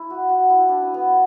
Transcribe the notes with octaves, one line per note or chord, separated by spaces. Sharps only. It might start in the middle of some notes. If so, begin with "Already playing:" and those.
Already playing: E4
F#4
F#4
E4
D4
C#4
B3